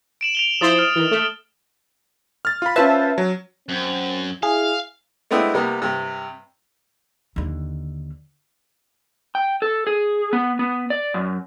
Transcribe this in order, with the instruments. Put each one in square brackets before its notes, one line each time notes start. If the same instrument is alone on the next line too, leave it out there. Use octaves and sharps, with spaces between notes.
[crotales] D7 E7 F#7
D7 F7 G7
[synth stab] F3 E4 C5 [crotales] D#6 A6 G7
[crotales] D#6 F6 D7
[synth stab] D#3 E3
A3
[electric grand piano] F6 A6
F4 B5
[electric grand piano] C#4 F4 C5 [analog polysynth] B4 E5 A5
[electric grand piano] F#3
[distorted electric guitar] F#2 [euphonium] C4
[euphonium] E4 [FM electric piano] G#4 [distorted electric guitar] F5
[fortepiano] G#3 A3 B3 C4 D4 E4
C3 G3 A#3 B3
G2 C3
[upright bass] D#2 D3
[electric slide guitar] G5
A4
G#4
B3
B3
D5
F#2